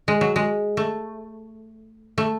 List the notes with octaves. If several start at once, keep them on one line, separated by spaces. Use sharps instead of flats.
G#3
F#3
G#3
A3
A3